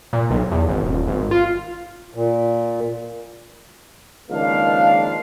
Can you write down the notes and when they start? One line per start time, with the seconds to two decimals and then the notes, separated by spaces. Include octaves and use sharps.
0.13 A#2
0.30 B1
0.51 E2
0.69 G#1
0.83 D#1
1.08 G#1
1.31 F4
2.15 A#2
4.30 C#2 D#3 F3 A#3 D4 F5